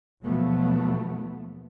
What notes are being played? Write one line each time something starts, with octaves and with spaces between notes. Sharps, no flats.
D#2 B2 F3 F#3 A3 B3